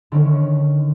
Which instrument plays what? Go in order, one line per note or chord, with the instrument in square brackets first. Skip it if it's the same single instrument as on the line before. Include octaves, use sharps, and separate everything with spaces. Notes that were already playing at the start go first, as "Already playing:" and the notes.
[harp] D3 D#3 C#4